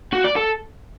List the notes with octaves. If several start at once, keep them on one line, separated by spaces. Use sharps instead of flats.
F#4
D5
A4